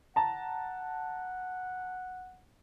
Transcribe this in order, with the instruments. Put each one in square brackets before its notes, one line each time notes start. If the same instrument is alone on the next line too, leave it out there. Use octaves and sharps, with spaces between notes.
[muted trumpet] F#5 [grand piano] A5 A#5